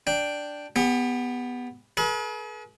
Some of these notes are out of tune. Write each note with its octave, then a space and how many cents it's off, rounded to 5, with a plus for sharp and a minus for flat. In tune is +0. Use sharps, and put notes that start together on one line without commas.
D4 +0 G5 +0
B3 +0 G4 +40
G#4 +40 B4 -45